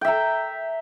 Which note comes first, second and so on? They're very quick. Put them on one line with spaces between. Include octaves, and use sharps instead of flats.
G5 E5 A#5